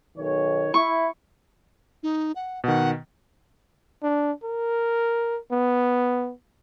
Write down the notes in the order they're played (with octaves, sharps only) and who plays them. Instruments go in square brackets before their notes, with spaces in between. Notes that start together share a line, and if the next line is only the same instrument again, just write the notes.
[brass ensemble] B1 D#3 C#5
[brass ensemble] E4 [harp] C#6
[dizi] D#4
F#5
[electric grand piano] B2 D#3 [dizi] F#5
[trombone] D4
A#4
B3